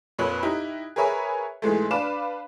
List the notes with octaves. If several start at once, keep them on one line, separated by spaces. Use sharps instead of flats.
F2 A#2 B4 C#5 F#6 F#7
D#4 E4 G4
G#4 A#4 B4 C#5 E5 G#5
G#2 E3 G#3 A3
D4 B4 F5 D6 E7